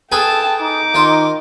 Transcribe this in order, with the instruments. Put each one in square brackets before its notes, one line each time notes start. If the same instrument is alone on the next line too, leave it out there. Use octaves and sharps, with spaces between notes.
[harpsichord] G#4 A4 B4 [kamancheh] G5 A5
[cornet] D#4 [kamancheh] D6
[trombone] D#3 [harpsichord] F4 C5